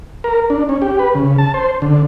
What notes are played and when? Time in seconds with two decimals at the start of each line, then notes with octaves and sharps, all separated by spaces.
0.24 A#4
0.50 D4
0.69 C#4
0.82 G4
0.99 B4
1.15 C#3
1.38 A5
1.54 C5
1.82 D3